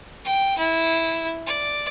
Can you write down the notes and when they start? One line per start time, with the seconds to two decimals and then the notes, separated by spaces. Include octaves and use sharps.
0.24 G5
0.58 E4
1.47 D5